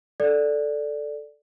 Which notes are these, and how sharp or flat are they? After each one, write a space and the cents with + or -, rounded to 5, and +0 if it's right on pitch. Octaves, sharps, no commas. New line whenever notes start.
A4 +0 D5 +5